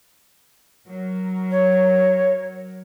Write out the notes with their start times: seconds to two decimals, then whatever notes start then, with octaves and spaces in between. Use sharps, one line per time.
0.87 F#3 A#4
1.51 C#5